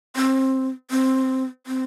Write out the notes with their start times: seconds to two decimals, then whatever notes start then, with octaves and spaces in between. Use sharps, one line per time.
0.16 C4
0.91 C4
1.67 C4